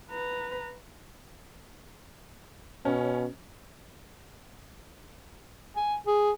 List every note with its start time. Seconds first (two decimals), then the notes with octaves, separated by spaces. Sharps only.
0.11 B4 A#5
2.85 B2 C#4
5.76 G#5
6.07 G#4